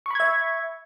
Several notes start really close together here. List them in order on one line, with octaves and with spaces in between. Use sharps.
C#6 B5 G#6 E5